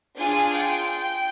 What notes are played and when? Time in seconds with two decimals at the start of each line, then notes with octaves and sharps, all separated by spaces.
0.18 D4 F4 G#4 G#5
0.53 G5